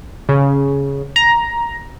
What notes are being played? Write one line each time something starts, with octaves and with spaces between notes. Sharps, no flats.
C#3
A#5